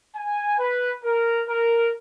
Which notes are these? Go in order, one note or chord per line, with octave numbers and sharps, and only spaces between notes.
G#5
B4
A#4
A#4